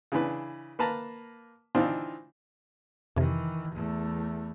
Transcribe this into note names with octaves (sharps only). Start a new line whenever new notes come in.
C#3 E3 D4 B4
A#3 B4 A5 A#5
E3 C4 D4 D#4 F4
F2 C3 D#3 E3
E2 A3